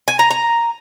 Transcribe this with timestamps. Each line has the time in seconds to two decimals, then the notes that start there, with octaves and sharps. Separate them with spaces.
0.08 G#5
0.19 A#5
0.31 A#5